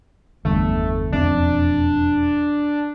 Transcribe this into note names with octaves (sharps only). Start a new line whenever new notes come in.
G1 E2 G2 A3
E1 F2 C4 D4